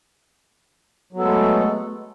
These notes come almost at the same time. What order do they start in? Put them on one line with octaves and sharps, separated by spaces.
F#3 B3 A4 G#3 A3